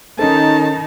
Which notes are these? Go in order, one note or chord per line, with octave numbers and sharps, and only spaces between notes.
D#3 C#4 D#4 A4 A5